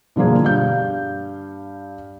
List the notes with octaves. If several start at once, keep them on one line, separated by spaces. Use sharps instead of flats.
B2 D3 F3 A#3 G#4
G2 F5 G6